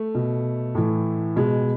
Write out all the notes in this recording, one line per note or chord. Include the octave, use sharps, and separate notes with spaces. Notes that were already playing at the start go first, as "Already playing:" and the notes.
Already playing: A3
B2
A2 E3
B2 G#3